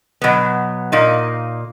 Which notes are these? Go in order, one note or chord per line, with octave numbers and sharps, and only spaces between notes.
B2 F#3 B3
A#2 A#3 D#4